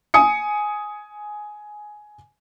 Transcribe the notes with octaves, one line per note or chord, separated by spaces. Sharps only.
G#5 D#6 C#7